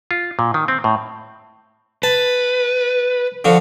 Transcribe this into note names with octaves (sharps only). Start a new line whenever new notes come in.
F4
A#2
D#3
C4
A2
B4 A5
D3 F3 F#4